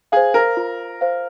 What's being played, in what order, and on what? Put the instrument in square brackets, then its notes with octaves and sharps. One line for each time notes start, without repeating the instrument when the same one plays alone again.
[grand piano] G#4 [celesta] C5 F5
[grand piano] A#4
[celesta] F4
C5 F5